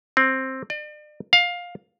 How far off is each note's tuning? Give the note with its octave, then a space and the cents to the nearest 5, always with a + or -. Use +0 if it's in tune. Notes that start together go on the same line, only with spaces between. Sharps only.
C4 +10
D5 +40
F5 +15